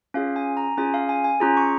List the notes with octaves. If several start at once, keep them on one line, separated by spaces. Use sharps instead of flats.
C#4 F4 G#4 F5
G#5
A#5
C#4 F4 G#4 G#5
F5
G#5
G#5
C#4 F4 G#4 A#5
C#6